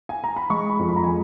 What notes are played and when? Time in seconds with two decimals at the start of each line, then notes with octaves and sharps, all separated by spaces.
0.09 G#5
0.24 A#5
0.36 B5
0.50 G#3 C#6
0.70 B5
0.79 F2
0.89 B5
0.96 A#5
1.03 G#5
1.08 G#3